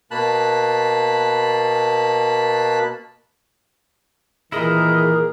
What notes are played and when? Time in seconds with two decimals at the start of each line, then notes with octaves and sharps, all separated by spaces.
0.11 B2 A#3 A5 B5 F#6
4.52 A#2 D#3 E3 E4 G#4 A#4 D#5